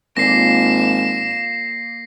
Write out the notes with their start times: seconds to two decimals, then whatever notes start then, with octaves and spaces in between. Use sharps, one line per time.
0.17 G#1 A#2 A#3 A#6 C7 E7